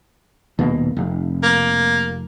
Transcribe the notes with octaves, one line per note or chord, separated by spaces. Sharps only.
D#1 B2 A#3
F1
A#3